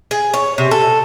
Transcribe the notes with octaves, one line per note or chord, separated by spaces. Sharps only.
G#4
C#5
C3
A4